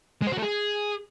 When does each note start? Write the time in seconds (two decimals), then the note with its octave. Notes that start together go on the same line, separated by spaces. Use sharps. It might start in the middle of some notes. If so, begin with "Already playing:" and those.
0.22 G#3
0.27 C5
0.32 F#4
0.37 A3
0.42 G#4